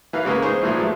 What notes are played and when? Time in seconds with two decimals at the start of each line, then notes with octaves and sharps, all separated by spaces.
0.13 E3 B4 F5
0.25 C#3 G#3 A#3 B3
0.42 D#4 G#4 C5 C6 C#6
0.62 A#2 E3 F3 G#3
0.79 F#3 A3